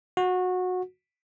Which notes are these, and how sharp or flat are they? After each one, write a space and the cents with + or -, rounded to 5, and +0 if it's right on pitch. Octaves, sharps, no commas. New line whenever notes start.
F#4 -20